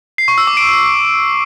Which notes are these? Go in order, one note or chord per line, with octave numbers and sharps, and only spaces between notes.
C7
C#6
E6
D6
D7